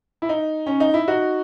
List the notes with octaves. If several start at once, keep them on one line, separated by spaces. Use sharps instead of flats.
E4
D#4
C#4
D#4
E4
D#4 F#4